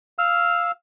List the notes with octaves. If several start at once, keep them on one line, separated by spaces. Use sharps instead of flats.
F5 E6 F6